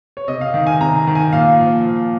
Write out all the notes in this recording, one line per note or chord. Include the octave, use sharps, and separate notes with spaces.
C#5
C3 D#5
F5
D#3
G#5
C3 A#5
D#3
G#5
A#2 F5
F3
A#2